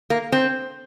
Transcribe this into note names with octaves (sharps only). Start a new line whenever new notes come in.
A#3
C4